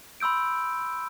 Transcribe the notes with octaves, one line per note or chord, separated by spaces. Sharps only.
B5 C6 E6 G6 D7